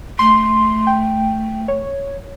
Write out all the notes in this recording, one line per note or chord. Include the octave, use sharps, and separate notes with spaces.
A3 C6
G5
C#5